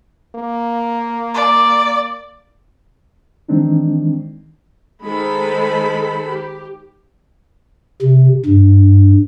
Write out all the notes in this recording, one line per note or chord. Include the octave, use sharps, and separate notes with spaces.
A#3
D5
D#3 E3 G#3 C4 D4 D#4
D#3 G#3 A4 C5 B5
G4
C3
G2